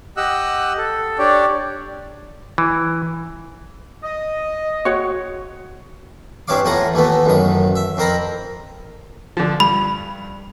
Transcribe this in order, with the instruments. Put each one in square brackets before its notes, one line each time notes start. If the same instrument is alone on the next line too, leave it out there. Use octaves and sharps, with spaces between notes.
[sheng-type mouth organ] G4 D#5 F#5 E6 F#6
A4
D4 G4 C#5 D5
[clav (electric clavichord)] E3
[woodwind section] D#5
[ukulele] F#4 C#5
[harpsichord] G2 E3 C4 C#5 F5 D6
E2 A2 F4 F#5 G#5 A#5
D#2 E3 A3 B3
A1 F#2 D#3 D#6
E5
F2 C4 A#4 A#5 B5
[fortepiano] D3 F3
[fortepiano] G2 [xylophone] B5